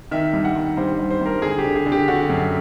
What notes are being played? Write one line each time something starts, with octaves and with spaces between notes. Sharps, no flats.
D#3 E5
G2
F#5
D#3
G2 C5
G2
C5
G2 A#4
D3 G#4
G4
D3
G#4
D3
G4
D3 F#4
F#2